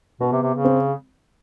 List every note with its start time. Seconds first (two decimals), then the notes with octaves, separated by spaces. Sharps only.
0.20 B2 B3
0.32 C3
0.42 C3
0.54 C#3
0.65 C4